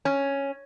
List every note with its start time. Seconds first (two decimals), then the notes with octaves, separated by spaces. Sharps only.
0.05 C#4